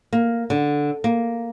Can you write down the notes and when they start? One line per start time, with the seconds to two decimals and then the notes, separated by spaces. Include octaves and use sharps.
0.13 A#3
0.50 D3
1.04 A#3